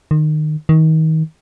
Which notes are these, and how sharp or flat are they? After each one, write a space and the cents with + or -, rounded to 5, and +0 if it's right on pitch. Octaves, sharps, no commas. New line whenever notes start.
D#3 -25
D#3 +30